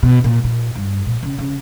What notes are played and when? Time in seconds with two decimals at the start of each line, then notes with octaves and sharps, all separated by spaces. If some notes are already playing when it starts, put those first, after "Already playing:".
0.03 B2
0.24 A#2
0.44 A#2
0.75 G2
1.06 A#2
1.23 C#3
1.38 C#3